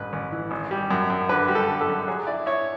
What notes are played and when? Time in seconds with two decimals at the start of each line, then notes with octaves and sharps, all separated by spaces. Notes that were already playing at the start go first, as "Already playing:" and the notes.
Already playing: A1 G2 B4
0.13 A1
0.32 E3
0.51 G#1
0.71 G3
0.91 F#2
1.10 F#2
1.29 D3 B4
1.48 G3
1.55 A4
1.68 D3
1.81 A4
1.87 F#2
2.08 F#3 G#4
2.27 E4 D5
2.46 E4 C#5